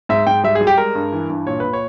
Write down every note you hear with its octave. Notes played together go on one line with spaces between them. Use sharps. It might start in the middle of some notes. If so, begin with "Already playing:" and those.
G#2 E5
G#2 G5
G3 E5
G#4
G3
G4
G#3 A#4
G2
E3
G2
A#2 C#5
A#2 B4
C#5